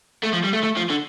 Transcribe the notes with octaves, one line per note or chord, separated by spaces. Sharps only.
A3
F3
G3
A3
A3
F3
D3